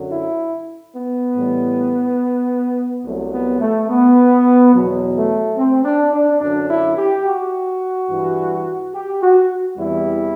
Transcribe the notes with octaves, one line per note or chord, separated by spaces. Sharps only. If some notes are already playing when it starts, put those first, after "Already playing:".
Already playing: F#2 D3 F#3
E4
B3
A2 E3 G3
C2 C3 F#3 A3
B3
A3
B3
E2 B2 F#3
A3
C4
D4
D4
F#2 D3 F#3 D4
E4
G4
F#4
G2 E3 G3
G4
F#4
E2 C3 E3 G3 E4